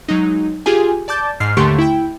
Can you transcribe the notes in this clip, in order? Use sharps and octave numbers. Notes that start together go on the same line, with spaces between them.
F#3 G#3 D#4
F4 G4 G#4 G#5
D5 A5 D6 G6 A6
G#2 F6 C7
D#2 D3 A3 G4 C6 C#6
E4 G5